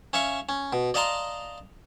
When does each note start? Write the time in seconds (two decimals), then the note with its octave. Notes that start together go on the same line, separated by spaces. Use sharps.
0.13 C#4 E5 F5 C#6
0.49 C#4
0.73 B2
0.94 D5 D#5 F5 A5 A#5 C6